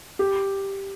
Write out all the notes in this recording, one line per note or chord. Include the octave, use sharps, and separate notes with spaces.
G4